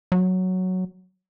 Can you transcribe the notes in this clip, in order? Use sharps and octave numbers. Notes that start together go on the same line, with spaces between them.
F#3